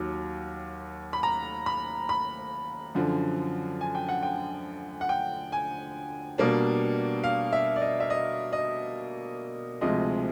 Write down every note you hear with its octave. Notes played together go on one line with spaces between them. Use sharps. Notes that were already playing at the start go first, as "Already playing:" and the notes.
Already playing: D#2 D#3 F#3
B5
A#5
B5
B5
F#2 D3 F3
G#5
G5
F#5
G5
F#5
G5
G#5
B2 G3 A#3 D4
F5
E5
D5
D#5
E5
D#5
D#5
D2 C3 F3 G#3 D#5